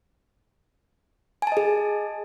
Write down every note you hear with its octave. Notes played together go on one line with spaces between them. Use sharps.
G#4 D#5 G#5 A5